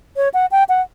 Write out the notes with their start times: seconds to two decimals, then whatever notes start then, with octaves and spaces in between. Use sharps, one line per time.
0.16 C#5
0.34 F#5
0.52 G5
0.69 F#5